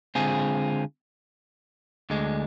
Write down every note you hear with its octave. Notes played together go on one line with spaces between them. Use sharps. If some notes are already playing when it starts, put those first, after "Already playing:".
D3 G#3 C4 F4 G#4
D2 D3 G#3